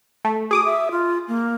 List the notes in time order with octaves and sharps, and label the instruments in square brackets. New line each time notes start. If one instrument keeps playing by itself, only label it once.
[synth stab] A3
[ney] F#4 [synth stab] G#4 D6 D#6
[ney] E5
F4
A#3